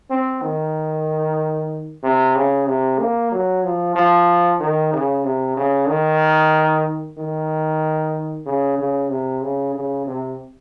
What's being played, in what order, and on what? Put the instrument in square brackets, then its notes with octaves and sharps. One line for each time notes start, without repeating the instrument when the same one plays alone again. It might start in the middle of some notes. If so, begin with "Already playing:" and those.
[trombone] C4
D#3
C3
C#3
C3
A#3
F#3
F3
F3
D#3
C#3
C3
C#3
D#3
D#3
C#3
C#3
C3
C#3
C#3
C3